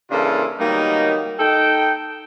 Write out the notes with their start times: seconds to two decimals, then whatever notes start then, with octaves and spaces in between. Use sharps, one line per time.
0.11 C#3 E3 A#3 D4 F4 A4
0.59 D#3 F#3 G3 A#3 B3 D#4
1.38 D#4 A4 G5